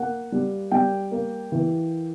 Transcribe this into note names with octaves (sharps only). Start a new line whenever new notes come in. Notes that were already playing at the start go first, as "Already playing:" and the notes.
Already playing: A#3 F#5
G3
G3 G5
A#3
E3